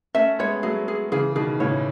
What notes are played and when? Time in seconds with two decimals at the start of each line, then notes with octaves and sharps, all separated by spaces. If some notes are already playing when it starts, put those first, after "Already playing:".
0.15 A3 C#4 E5
0.39 G#3 B3 C#5
0.63 F#3 A3 G#4
0.88 G#4
1.12 C#3 E3 G#4
1.35 B2 D#3 G#4
1.60 A2 C#3 C#5